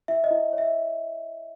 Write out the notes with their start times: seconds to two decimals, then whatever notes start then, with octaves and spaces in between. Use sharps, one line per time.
0.08 E4 E5
0.24 D#5
0.31 E4
0.53 C#5
0.58 E5